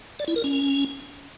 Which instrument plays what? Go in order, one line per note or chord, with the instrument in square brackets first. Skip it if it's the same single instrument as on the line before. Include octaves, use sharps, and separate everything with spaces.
[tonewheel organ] D5
E4
A#4
C#4